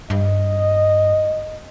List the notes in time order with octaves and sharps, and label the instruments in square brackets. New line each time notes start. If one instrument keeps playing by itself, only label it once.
[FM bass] G2 [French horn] D#5